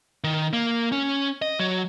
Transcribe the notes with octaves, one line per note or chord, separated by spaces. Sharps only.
D#3
A#3
C#4
D#5
F#3